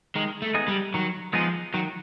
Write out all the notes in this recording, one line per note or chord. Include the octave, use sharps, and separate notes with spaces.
D#3 G#3
A3
G#3 B3 D#4 G#4
G3
D#3 F#3
F3 G#3 B3 D#4 G#4
D#3 F#3